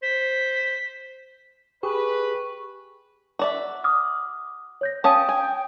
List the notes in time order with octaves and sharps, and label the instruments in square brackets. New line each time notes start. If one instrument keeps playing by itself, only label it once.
[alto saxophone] C5 [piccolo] B6
[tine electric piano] G4 G#4 [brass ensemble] B4 [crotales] C#6
[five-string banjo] F#4 D5 E5
[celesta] D6 D#6 F6
C#5 G6 A#6
[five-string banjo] C#4 A5 [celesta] F5 D#6 D#7 [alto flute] G5
[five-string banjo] G#5